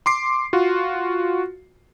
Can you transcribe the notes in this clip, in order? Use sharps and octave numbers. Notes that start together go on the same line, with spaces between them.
C6 D6 C7
F4 F#4